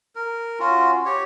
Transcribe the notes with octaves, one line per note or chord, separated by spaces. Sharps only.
A#4
C#4 F4 F#4
G4 C#5